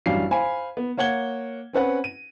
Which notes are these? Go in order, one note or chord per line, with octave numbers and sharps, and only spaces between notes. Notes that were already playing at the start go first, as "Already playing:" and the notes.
A1 F#2 G3 D4 F5 C7
C5 F5 G#5 B5
B3
A#3 C#5 F#5 G#6 G7
C4 C#4 B4 F#5
D#7